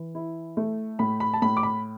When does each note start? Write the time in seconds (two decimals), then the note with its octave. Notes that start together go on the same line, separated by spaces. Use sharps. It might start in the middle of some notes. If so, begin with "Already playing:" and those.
Already playing: E3
0.15 E4
0.57 A3
0.99 A2 B5
1.20 B5
1.34 A5
1.42 A2 B5
1.57 D6
1.63 B5